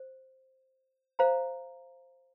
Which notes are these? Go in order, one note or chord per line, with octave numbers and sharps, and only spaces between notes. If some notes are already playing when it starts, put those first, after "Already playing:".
Already playing: C5
C5 F5 A#5